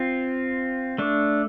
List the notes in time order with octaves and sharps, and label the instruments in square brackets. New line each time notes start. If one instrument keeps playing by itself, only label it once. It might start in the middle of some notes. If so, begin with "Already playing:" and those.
Already playing: [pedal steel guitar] C4 F4
A3 D4